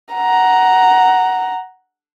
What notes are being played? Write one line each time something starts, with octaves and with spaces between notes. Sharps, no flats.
F#5 A#5